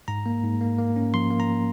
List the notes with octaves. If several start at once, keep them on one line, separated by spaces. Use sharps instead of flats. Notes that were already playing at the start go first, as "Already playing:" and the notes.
G#2 A#5
A#3
G#2
A#3
A#3
C#4
F3 C6
A#3
A#5